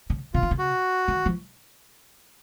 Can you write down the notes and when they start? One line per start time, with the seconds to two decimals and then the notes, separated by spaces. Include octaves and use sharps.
0.10 C#3
0.34 C#3 F4
0.43 D#3
0.51 C#3
0.59 F#4
1.08 D#3
1.26 F3